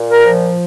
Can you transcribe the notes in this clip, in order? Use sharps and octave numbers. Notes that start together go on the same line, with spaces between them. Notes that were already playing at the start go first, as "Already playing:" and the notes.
Already playing: A#2
A#4
F3